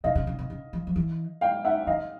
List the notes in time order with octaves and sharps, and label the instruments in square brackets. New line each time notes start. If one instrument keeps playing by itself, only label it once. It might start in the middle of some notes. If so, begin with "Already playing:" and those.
[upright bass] B2 [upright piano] D#5 F5
[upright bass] C#3
C#3
C3
C#3
E3
F3
E3
[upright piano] F5 G5
E5 F#5
[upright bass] D#3 [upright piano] D#5 F5